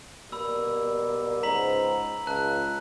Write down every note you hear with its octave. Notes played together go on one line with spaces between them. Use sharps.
B2 G3 A#3 B5 E6
C#2 G#2 A#5 B6 F#7
C#2 A5 F#6